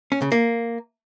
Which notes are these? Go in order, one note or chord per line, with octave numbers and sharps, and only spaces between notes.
C#4
C#3
A#3